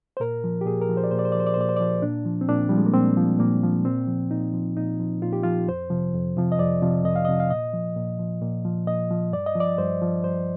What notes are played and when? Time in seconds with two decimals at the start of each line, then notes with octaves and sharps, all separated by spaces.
0.17 C5
0.20 A#2 A#4
0.44 F3
0.61 G4
0.66 A#2 G#4
0.81 A#4
0.89 F3
0.97 C5
1.04 D5
1.11 A#2 C5
1.19 D5
1.25 C5
1.32 D5
1.35 F3 C5
1.47 D5
1.54 C5
1.57 A#2 D5
1.69 C5
1.76 D5
1.80 F3 C5
2.02 A#2 D4
2.25 F3
2.41 C4
2.49 A#2 D4
2.69 F3 G3
2.77 G#3
2.86 A#3
2.94 A#2 C4
3.17 F3
3.39 A#2 A#3
3.63 F3
3.85 A#2 C4
4.08 F3
4.31 A#2 D#4
4.53 F3
4.77 A#2 D#4
4.99 F3
5.22 A#2 F4
5.33 G4
5.43 F3 F4
5.68 F2 C5
5.90 C3 F3
6.13 F2
6.37 C3 F3
6.52 D#5
6.59 F2 D5
6.82 C3 F3
7.04 F2 D#5
7.16 F5
7.25 D#5
7.28 C3 F3
7.40 F5
7.50 A#2 D#5
7.74 F3
7.96 A#2
8.19 F3
8.41 A#2
8.65 F3
8.87 A#2 D#5
9.11 F3
9.32 G2 D5
9.46 D#5
9.55 F3
9.60 D5
9.78 G2 C5
10.02 F3
10.24 G2 C5